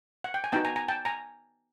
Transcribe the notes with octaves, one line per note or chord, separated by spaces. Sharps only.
F#5
G5
G#5
B3 D#4 F#4 G5 A5
G#5 A#5
G#5 A#5
G5 A5
G#5 A#5